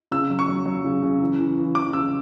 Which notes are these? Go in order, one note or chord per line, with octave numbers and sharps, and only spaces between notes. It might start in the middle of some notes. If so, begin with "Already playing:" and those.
C#3 E6
F#3
C#6
F#3
F#3
C#3
C#3
E3
E3
E3
E3 D6
C#3 E6